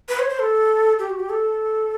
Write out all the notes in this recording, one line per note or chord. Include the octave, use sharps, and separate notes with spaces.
B4
C#5
C5
A4
G4
F#4
G4
A4